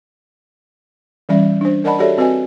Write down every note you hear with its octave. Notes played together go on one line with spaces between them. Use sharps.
E3 G3 C#4 D5 E5
D4 C5
A#4 D5 D#5 F#5 A5 B5
F#4 G4 A4 C#5 D5 E5
C4 F#4 B4 D#5 G#5